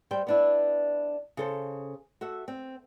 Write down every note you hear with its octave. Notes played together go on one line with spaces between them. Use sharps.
G3 C5 G5
B3 D4 E4
C#3 A4 C5
F#4 A4 E5
C4